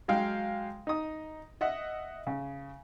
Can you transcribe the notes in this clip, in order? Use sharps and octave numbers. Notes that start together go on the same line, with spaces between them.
F#3 G#3 F5 G5
D#4 D#6
D#5 E5 F#5
C#3